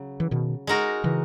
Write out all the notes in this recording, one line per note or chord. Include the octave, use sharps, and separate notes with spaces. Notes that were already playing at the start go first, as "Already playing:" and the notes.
Already playing: C#3 F#3
E3
B2 D#3
G#3 D#4 F#4 A#4
C#3 E3